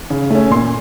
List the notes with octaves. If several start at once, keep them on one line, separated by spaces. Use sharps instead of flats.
C#3
A3 C#4
A#2 C6